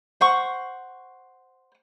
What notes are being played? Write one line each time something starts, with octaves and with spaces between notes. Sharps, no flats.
C5 F#5 C#6